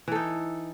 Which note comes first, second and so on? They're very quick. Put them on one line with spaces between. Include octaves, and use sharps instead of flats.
E3 A4 D#4